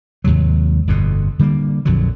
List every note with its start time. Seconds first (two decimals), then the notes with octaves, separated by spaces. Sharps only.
0.24 D#2 G#2 C3 F#3
0.87 G1 F2 B2 D3
1.39 D3 G3 G#3 A#3
1.85 A#1 F2 D3 F#3